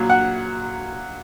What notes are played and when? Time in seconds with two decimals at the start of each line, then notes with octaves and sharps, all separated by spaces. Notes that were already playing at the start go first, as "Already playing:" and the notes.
Already playing: A#2 F#3
0.10 F#5